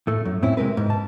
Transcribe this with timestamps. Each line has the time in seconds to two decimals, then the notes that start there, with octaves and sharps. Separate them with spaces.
0.07 A2 A3
0.25 F#2
0.42 A2 C4 C#4 E4
0.57 C3 G#3 A#4 B4
0.77 G#2
0.90 A5